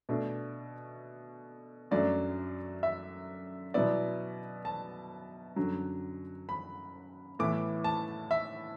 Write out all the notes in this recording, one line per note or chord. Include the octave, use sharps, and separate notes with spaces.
B2 A3 D4
F#2 F#3 A3 D4 D5
E5
B2 F#3 B3 E4 D5
A5
F#2 D3 F#3
B5
A2 E3 B3 E4 D6
A5
E5